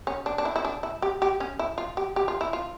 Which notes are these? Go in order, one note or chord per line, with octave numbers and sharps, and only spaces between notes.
C#4
D4
D4
E4
E4
D4
E4
G4
G4
C#4
E4
F4
G4
G4
F4
E4
F4